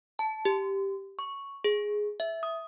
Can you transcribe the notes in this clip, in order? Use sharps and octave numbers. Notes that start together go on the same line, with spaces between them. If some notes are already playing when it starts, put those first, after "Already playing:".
A5
G4
C#6
G#4
E5
D#6